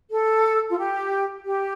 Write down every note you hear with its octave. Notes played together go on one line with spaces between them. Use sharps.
A4
F4
G4
G4